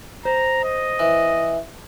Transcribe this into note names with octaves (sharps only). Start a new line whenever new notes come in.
C5 A#5
D#5
E3